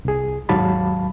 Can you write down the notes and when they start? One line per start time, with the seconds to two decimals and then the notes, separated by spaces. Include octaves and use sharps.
0.05 C2 G#4
0.49 D#2 G#2 F#3 F5 A5 B5